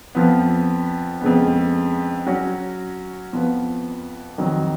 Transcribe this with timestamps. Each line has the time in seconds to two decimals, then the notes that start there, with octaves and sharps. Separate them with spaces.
0.15 F2 F3 B3
1.21 F2 C#3 G#3 B3
2.26 F#3 C#4 F#4
3.33 F2 F3 B3
4.38 F2 D#3 F#3